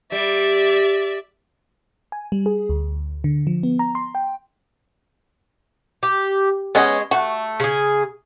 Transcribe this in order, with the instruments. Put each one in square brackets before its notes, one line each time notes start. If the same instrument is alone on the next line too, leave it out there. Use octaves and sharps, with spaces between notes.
[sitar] G3 [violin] D5 E5
[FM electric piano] G#5
G3
G#4
D2
D3
F3
B3
A#5
C6
G5
[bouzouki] G4
[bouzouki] G#3 [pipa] B3 C#4 D#5
[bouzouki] A3 [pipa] F#4
[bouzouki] C#3 G#4